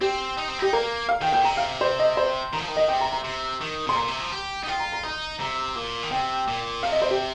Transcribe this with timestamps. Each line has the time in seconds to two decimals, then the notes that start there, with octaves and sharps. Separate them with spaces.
0.01 C4 G4
0.37 D#4
0.48 C4
0.59 D#4 G4
0.73 A#3 A#4
1.09 F5
1.21 D#3 G5
1.32 A#2 G5
1.44 C3 A#5
1.57 F5
1.81 C5
1.99 D#5
2.17 C5
2.53 D#3 A#5
2.61 F3
2.68 D#3
2.77 D#5
2.88 C3 G5
3.01 A#5
3.12 A#5
3.24 C3
3.61 D#3
3.87 C3 C6
3.96 A#2 A#5
4.08 C3
4.20 F3
4.32 G4
4.63 D#4
4.67 F4 G5
4.79 A#5
4.92 A#5
5.03 D#4 A#5
5.40 C3 A#5
5.75 A#2
6.03 D#3
6.11 C3 G5
6.48 A#2
6.83 C3 F5
6.92 D#5
7.02 C5
7.11 G4